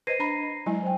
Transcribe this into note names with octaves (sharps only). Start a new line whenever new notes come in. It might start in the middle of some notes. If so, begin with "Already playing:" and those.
B4 C5 D#5 A#6 C7 D#7
D4 A#5 B5
F#3 G#3 E4 G#5
C5 G5